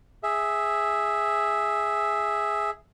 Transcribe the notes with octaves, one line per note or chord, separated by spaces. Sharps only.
G#4 E5